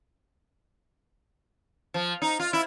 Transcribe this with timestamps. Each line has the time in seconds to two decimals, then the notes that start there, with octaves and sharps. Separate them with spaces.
1.94 F3
2.22 D#4
2.40 F4
2.53 E4